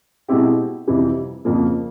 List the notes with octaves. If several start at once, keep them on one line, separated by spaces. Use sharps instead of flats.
B2 G#3 C4 E4 G4
F2 C3 E3 G3
F2 C#3 F3 A#3